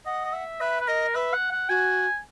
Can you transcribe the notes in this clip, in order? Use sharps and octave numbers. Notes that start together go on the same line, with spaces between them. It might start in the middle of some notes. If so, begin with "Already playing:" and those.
D#5 F#5
D#5
E5
B4 E5
B4
A#4 D#5
B4 E5
F#5
F#5
F#4 G#5